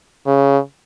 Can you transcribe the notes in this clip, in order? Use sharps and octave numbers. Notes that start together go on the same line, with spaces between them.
C#3